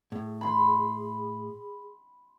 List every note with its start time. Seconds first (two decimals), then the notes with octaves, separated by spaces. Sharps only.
0.12 A2 G#4
0.41 B5 C6